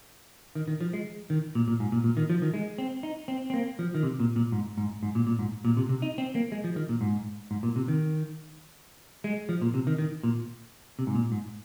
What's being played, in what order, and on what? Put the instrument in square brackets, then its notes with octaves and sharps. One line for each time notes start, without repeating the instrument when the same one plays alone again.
[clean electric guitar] D#3
D#3
F3
G#3
D#3
A#2
A#2
G#2
A#2
A#2
D#3
F3
D#3
G#3
C4
D#4
C4
C4
A#3
F3
D#3
C3
A#2
A#2
G#2
G#2
G#2
A#2
A#2
G#2
A#2
C3
C3
D#4
C4
A#3
G#3
F3
D#3
A#2
G#2
G#2
A#2
C3
D#3
G#3
F3
A#2
C3
D#3
D#3
A#2
C3
G#2
A#2
G#2